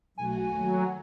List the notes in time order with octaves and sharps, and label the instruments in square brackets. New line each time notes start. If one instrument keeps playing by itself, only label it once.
[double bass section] B1 [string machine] A3 F#4 [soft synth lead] G#5
[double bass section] D#2 [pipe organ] F#3